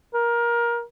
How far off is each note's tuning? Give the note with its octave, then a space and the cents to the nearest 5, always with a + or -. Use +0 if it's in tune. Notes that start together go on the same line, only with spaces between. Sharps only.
A#4 +20